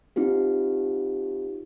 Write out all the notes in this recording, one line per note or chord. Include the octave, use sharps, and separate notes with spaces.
C4 D#4 F4 G4